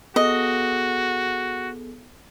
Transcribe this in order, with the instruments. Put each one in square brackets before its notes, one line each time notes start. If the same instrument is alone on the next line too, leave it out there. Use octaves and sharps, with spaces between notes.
[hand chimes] B3 G#4 A4 [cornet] F#4 [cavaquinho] D#5